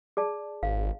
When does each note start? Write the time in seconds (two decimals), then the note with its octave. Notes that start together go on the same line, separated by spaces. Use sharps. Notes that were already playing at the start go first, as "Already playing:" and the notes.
0.17 G#4 D5 A5
0.63 G#1 F5